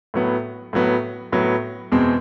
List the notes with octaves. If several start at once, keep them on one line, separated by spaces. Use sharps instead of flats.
A2 F#3 B3
A2 F#3 B3
A2 F#3 B3
E2 B2 G#3 C4